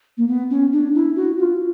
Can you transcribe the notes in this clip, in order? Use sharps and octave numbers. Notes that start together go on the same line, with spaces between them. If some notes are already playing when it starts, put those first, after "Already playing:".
A#3
B3
C#4
D4
E4
F#4
F4